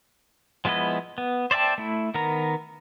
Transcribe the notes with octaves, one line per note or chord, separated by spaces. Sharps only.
F3 G#3 B3 E4 D#5
B3
C5 D5 E5 G5 A5
A3 E4
D#3 B3 A#4 A#5